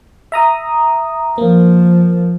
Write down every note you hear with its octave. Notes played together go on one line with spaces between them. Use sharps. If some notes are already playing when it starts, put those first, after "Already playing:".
E5 A#5 D#6
F3 A#3